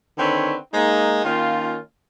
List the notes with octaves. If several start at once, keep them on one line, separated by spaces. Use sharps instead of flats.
D3 D#3 C4 B4 C#5
G#3 A#3 D#4
D#3 A#3 C#4 F4